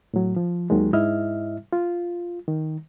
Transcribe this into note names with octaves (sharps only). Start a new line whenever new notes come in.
A2 F#3
F3
D#2 D#3 F#3 G#3
G#2 E4 D#5 E5 F6
F4
D#3